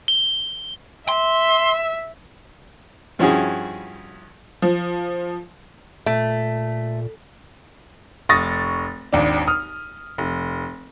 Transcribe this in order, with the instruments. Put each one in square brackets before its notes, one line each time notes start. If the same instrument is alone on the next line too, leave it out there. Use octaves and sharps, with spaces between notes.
[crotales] G7
[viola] E5 [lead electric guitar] C6
[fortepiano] G2 F3 C#4 E4 F#4 G#4
[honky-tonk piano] F3
[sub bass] A#2 [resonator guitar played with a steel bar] A3
[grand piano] F1 C#6 D#6 A6 A#6
G#1 D#2 D4
D#6 F6
F1